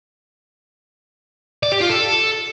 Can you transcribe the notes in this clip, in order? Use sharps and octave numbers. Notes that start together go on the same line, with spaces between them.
D5
G4
F4
A4